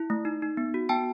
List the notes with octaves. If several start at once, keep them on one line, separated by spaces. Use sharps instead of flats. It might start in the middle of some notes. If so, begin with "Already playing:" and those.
Already playing: E4
A3
D#4
D#4
B3
F#4
B3 G5 A5